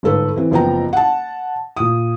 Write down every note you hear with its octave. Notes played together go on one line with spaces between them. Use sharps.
G1 G#2 A4 B4
E3 C4
F#1 F3 B3 G5 A#5
F#5 A5
A#2 D#6